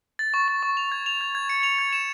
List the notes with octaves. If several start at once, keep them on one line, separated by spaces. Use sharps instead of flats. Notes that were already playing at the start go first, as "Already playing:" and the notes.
A6
C#6
C#6
C#6
F7
G#6
F7
G#6
G#6
C#7
F7
G#6
E7